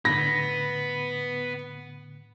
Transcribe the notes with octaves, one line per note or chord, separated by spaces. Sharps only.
A2 D3 B3 B5 A#6